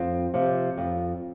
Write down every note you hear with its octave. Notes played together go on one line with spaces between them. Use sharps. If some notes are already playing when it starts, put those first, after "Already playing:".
Already playing: F2 C4
C3 F3
F2